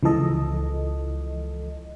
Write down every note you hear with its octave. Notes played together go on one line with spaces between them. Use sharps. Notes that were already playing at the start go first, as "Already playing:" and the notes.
C#2 E3 F3 G#3 A4 D#5